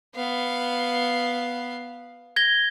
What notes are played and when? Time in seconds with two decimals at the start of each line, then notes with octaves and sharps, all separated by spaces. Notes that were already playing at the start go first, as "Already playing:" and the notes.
0.15 B3 F5
2.36 G#6 A#6 G7